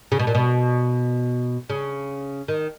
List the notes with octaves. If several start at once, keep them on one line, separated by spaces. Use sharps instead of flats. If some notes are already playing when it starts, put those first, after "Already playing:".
C#3
B2
A#2
B2
C#3
D#3